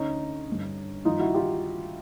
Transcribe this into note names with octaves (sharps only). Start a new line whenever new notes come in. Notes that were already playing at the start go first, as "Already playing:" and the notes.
Already playing: D2 D3 C#4 D#4
G2 D3
G2 D#3 D#4 F4
E4 F#4
F4 G4